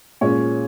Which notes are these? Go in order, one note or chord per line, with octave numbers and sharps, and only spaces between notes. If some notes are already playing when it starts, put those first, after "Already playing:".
A#2 G#3 C#4 C#5